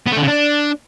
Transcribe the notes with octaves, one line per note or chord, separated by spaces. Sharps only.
B3
A3
D3
C#3
D4